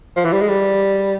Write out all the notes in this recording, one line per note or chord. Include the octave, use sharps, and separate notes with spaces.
F3
E3
G3
G#3
G3